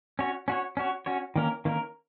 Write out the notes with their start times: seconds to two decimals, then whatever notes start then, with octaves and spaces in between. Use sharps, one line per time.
0.19 C#4 F#4 C#5
0.48 C#4 F#4 C#5
0.77 C#4 F#4 C#5
1.06 C#4 F#4 C#5
1.36 D#3 A#3 C#4 A#4
1.65 D#3 A#3 C#4 A#4